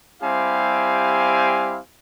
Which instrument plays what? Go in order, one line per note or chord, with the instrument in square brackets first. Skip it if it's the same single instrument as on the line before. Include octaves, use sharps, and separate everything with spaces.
[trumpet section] G3 C4 E4 G4 F5 G#5